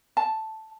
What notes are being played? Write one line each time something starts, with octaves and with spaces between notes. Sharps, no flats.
A5